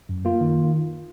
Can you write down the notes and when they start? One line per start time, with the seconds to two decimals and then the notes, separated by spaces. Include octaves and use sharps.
0.09 F#2
0.25 A#3 F4
0.41 D#3